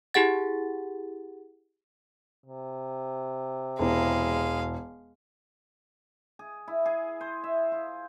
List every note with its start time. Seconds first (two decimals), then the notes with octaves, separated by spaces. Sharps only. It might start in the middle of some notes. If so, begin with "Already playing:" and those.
0.14 E4 G4 G#4 F#5 A6
2.46 C3
3.79 E1 G#3 E4 F5
6.39 G#4
6.68 E4
6.86 G#4
7.21 C5
7.44 E5
7.72 F4